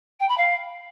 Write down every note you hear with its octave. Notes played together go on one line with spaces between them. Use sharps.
G5
B5
F5